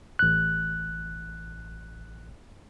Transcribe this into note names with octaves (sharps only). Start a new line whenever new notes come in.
A1 F#6